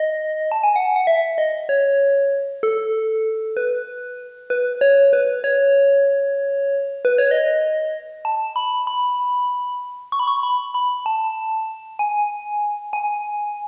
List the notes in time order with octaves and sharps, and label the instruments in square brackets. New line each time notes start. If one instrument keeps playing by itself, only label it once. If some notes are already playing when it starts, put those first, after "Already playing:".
Already playing: [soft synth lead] D#5
A5
G#5
F#5
F#5
E5
D#5
C#5
A4
B4
B4
C#5
B4
C#5
B4
C#5
D#5
A5
B5
B5
C#6
B5
C#6
B5
B5
A5
G#5
G#5